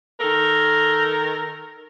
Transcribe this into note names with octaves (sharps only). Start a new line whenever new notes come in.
D#3 A4 A#4